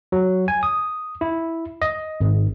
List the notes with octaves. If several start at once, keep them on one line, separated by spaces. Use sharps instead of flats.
F#3
G#5
D#6
E4
D#5
G#1